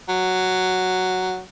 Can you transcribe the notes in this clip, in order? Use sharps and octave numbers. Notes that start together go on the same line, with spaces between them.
F#3